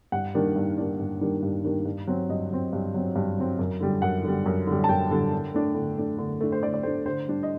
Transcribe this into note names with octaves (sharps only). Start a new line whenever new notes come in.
G2 F#5
D#3 G3 A#3 D4
G2
D#3 G3 A#3 D4
G2
D#3 G3 A#3 D4
G2
D#3 G3 A#3 D4
G2
F#3 C4
G2 D#5
F#3 C4
G2
F#3 C4
G2
F#3 C4
F#2
D3 G3
F#2 F#5
D3 G3
F#2
D3 G3
A5
F#2 G5
D3 G3
D3
A3 D4
D3
A3 D4
D3
A3 D4
C5
D3 D5
D5
A3 D4 C5
D3 C5
G3 D4
D#5